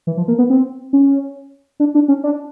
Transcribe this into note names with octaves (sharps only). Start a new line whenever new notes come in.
E3
F3
A#3
B3
C4
C#4
D4
D4
C#4
D4